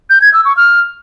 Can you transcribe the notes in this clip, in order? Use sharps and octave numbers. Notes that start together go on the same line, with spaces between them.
G6
G#6
E6
C#6
F6